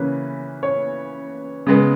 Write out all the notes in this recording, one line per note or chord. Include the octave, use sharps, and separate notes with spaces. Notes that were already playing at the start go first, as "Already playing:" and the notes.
Already playing: C#3 E3 A#3 C#4 B4
C#5
C#3 G#3 B3